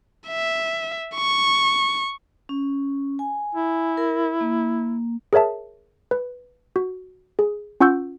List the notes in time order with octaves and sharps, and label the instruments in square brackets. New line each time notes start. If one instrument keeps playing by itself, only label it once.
[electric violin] E5
C#6
[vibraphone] C#4
G#5
[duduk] E4
[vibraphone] A#4
A#3
[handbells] G#4 A#4 C#5 E5 A5
B4
F#4
G#4
C#4 F4 F#5 C#6 E6 G6